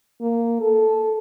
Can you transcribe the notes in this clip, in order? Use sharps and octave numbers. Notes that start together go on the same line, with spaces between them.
A#3
A4